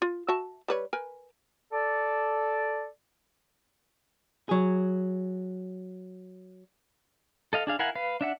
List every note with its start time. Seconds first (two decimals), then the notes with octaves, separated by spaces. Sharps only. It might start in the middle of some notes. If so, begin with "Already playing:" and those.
0.02 F4
0.28 F#4 E5 A5
0.68 G3 B4 C#5
0.93 A#4 B4 G#5
1.71 A4 D5
4.49 F#3 G#4
7.53 A4 D#5 F5
7.67 D4 G#4 F5
7.79 E4 A#4 F5 F#5 G#5
7.95 B4 F5
8.21 D4 E5 F#5